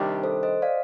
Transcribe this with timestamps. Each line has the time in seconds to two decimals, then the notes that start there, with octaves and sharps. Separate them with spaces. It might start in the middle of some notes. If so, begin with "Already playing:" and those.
Already playing: C3 D#3 G3 D4 G4
0.23 A4 C5
0.43 C5 D#5
0.62 D5 F5